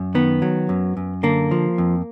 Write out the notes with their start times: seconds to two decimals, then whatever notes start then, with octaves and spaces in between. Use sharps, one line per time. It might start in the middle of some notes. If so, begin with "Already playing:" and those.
Already playing: F#2
0.15 D#3 B3
0.42 F#3
0.69 F#2
0.97 F#2
1.23 D3 A#3
1.51 F3
1.78 F2